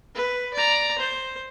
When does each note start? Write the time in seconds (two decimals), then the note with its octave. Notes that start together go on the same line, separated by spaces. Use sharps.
0.15 B4
0.54 D5 A#5
0.99 C5